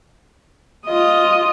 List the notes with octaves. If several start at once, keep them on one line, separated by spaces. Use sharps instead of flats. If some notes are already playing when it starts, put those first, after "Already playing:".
F4 D#5